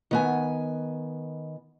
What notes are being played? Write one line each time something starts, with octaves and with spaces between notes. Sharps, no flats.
D#3 B3 G#5